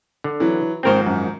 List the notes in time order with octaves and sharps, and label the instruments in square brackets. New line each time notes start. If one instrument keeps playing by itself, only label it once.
[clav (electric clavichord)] D3
[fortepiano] E3 F#3
[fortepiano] G#2 D#3 F3 [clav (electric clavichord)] C4 A#4 C5
[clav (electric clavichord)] F#2